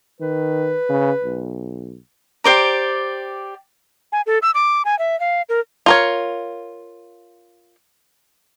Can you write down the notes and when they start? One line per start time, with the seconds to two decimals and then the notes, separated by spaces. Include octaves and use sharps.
0.20 D#3 B4
0.89 C#3
1.24 B1
2.44 G4 C5 D5 A#5
4.12 G#5
4.27 A4
4.42 E6
4.55 D6
4.85 G#5
4.99 E5
5.20 F5
5.49 A#4
5.86 F4 A#4 C#5